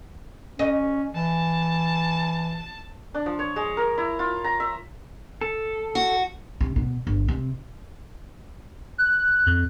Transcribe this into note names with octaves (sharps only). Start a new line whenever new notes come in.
C#4 D#5
E3 A5
D4
F3
C#5
G#3
A#4
E4
F4
A#5
E5
A4
F#4
C3
B2
G1
C3
F#6
F2